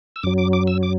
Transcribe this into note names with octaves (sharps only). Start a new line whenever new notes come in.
E6
F#2 F#3 D6
D6
D6
E6
D6